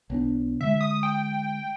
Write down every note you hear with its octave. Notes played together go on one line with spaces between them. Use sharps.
B1 B3 D4
D3 G#3 E5
D#6
G5